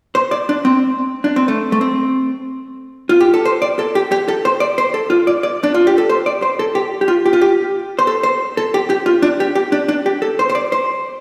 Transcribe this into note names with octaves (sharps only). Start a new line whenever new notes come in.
C5
D5
D4
C4
D4
C4
A3
A3
C4
F4
G4
A4
C5
D5
A4
G4
G4
A4
C5
D5
C5
A4
F4
D5
D5
D4
F4
G4
A4
C5
D5
C5
A4
G4
G4
F4
G4
F4
G4
C5
A4
C5
A4
G4
G4
F4
D4
G4
G4
D4
D4
G4
A4
C5
C5
D5
C5